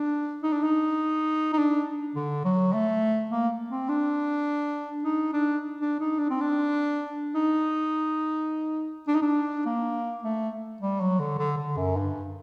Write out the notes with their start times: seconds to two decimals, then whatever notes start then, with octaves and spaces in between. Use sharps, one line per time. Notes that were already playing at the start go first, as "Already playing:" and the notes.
Already playing: D4
0.43 D#4
0.53 D4
0.63 D#4
1.53 D#4
1.58 D4
2.15 D3
2.45 F#3
2.73 A3
3.31 A#3
3.69 C4
3.89 D4
5.04 D#4
5.33 D4
5.81 D4
6.00 D#4
6.19 D4
6.30 C4
6.41 D4
7.35 D#4
9.08 D4
9.15 D#4
9.22 D4
9.66 A#3
10.23 A3
10.81 G3
11.00 F#3
11.19 D3
11.39 D3
11.58 D3
11.77 F#2
11.97 G2